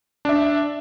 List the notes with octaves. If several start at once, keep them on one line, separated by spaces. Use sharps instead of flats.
D4 E5